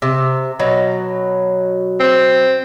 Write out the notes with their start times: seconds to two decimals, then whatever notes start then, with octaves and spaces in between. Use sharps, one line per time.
0.02 C3
0.60 B2 F#3
2.00 C4